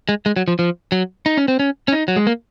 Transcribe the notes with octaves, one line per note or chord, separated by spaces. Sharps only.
G#3
G#3
F#3
F3
F3
F#3
D#4
C#4
C4
C#4
C#4
D#4
F#3
G#3
A#3